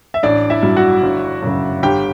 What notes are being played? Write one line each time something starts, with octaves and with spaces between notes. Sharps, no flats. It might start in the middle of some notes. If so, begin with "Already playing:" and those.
E5
A1 D4 D5
E4 E5
G2 F#3
F#4 F#5
G1
F#2 C#3
G1 G4 G5